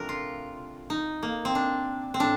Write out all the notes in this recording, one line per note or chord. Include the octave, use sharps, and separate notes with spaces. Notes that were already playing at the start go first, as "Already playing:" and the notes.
Already playing: C3 F3 A3 D4 A#4
F4
D#4
A#3
C4
D4
C4
A2 D4